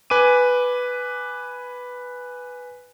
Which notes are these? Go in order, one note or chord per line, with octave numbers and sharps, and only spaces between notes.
B4 G#5 D6 D#7